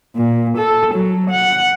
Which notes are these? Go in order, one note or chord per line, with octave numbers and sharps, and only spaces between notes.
A#2
A4
F#3
F#5